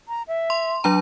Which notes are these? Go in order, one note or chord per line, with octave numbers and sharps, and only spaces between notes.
A#5
E5
C6
F#3 D4 A#5